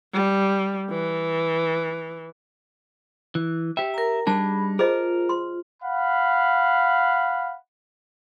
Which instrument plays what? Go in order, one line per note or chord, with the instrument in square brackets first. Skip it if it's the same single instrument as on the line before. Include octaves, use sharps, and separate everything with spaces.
[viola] G3
E3
[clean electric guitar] E3
[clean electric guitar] G4 E5 [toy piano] G5
[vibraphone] A#4 A#5
[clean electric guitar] G3 D4 D#4 [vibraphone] G#4 B5 [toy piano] A5
[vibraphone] F4 [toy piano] G#4 C5 D#5 [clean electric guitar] A#4
[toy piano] C6
[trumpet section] F5 F#5 B5